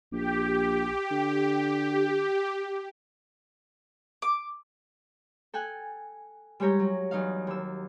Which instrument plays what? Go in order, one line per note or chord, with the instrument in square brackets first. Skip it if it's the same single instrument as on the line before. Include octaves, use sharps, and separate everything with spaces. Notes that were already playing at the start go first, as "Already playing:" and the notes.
[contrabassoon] A#1 [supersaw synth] G4
[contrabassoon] D3
[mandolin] D6
[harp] A4 G5 G#5 F#6
G3 G#3 G4 C#5 A#5 G6
F#3
E2 F#3 D#4 F5
D#2 E6